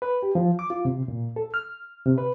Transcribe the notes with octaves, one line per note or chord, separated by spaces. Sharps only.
B4
G4
F3
D6
F4
C3
A#2
A4
F6
C3
B4